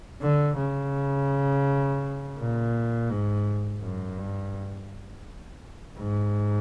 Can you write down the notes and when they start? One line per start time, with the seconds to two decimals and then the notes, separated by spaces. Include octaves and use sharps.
0.22 D3
0.57 C#3
2.37 A#2
3.10 G#2
3.82 F#2
4.18 G2
5.98 G#2